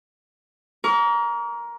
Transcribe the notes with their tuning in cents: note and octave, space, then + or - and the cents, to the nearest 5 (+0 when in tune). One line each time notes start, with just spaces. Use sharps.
A#4 +15 D6 -45